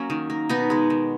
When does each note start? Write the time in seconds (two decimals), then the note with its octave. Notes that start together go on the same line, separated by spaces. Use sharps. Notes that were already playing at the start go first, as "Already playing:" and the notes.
Already playing: F#3 A#3 C#4
0.10 D#3
0.30 A#3
0.49 B2 B3 D#4
0.70 G#3 B3
0.90 D#3